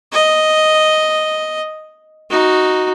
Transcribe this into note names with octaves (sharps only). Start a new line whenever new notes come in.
D#5
D#4 F#4